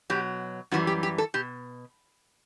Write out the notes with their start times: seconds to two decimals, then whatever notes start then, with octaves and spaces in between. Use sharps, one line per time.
0.10 B2 F#3 G4
0.71 F#2 E3 G3 F#4
0.87 G4
1.03 G4
1.18 A4
1.34 B2 G4